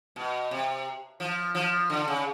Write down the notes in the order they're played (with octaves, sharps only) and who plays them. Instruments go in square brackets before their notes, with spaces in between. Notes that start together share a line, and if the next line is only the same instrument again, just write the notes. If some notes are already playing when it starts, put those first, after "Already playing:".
[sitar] B2
C3
F3
F3
D3
C#3